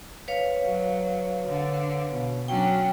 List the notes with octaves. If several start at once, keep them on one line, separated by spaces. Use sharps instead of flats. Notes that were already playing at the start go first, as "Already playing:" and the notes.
B4 C#5 F5
F#3
D3
B2
F#3 C#4 D4 G5